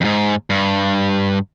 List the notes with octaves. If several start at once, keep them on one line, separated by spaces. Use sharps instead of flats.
F2 G#2
G2